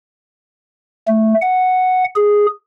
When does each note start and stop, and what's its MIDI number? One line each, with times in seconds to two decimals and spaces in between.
1.08 1.34 57
1.41 2.04 78
2.16 2.46 68